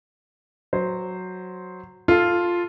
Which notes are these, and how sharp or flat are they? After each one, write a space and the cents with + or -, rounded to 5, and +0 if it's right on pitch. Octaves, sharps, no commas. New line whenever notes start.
F#3 -5 C5 +0
F4 +0 A4 +0